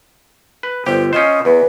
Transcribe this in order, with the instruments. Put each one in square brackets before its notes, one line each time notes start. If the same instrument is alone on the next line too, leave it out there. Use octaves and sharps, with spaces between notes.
[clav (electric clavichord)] B4
[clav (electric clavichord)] G1 G4 [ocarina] C5
[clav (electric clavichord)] C#4 F4 C5 [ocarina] D#5
[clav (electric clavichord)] E2 [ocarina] B4